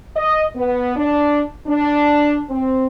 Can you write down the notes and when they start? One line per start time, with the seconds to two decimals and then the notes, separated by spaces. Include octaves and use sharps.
0.16 D#5
0.55 B3
0.96 D4
1.67 D4
2.50 C4